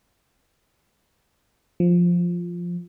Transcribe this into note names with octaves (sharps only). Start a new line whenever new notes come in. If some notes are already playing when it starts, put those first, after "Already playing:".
F3